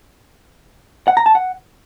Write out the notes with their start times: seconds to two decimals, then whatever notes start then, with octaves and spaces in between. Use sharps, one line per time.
1.08 F#5
1.17 A#5
1.26 A5
1.35 F#5